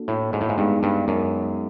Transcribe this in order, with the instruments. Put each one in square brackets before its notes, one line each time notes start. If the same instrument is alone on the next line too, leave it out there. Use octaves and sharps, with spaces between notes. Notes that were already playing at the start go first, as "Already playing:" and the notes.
Already playing: [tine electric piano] A#3 D4 F#4 A4
[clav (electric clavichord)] A2
G#2
A2
G#2
[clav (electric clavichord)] G2 [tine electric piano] G#3 B3 D#4 G#4
[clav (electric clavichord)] G2
F#2